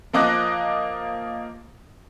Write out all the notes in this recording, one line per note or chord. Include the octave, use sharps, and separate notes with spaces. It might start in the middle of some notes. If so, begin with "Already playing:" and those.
F3 A#3 D#5 D6 F#6 A#6